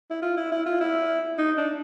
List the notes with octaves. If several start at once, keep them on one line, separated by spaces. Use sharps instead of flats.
E4
F4
E4
E4
F4
E4
D#4
D4